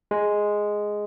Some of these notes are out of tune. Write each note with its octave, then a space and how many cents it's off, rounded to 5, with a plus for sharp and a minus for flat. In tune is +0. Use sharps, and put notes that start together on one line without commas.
G#3 +0